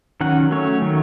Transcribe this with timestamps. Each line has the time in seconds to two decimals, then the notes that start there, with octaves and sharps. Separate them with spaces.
0.21 D#3 F#3 C#4 F#5
0.51 F#3 A3 C#4 C#5
0.82 D#3 F#3 A3